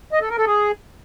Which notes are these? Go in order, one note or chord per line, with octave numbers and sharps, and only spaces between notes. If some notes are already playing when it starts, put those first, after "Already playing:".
D#5
A4
A#4
A4
G#4